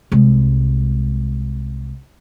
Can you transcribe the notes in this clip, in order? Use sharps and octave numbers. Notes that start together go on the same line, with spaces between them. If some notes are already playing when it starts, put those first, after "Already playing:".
C2 G#3